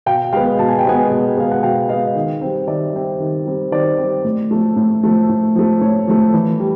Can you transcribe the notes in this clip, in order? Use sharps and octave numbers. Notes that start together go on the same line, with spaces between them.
B2 F5 G5
G#3 B3 F5 G5
B2 A5
G#5
G5
G#3 B3 F#5 G#5
B2
G#3 B3 F5
F#5
B2 F5 G5
G#3 B3 D#5 F5
D#3
G3 C4
D#3 D5 E5
G3 C4
D#3
G3 C4
D#3 C5 D5
G3 C4
A2
F3 A3
A2
F3 A3
A2
F3 A3
A2 C#5
F3 A3
E3
G3